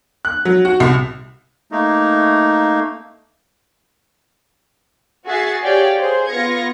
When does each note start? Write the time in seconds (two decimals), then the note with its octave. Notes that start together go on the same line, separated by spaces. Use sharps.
0.25 F#6
0.45 F#3
0.65 F#4
0.80 C2
1.71 A3 A#3 D#4
5.26 F#4 G#4 E5 A6 C7
5.64 G4 G#4 C#5 D5 F5 G5
5.99 G#4 C5
6.29 B3 F4 F5 G#6 A#6 C#7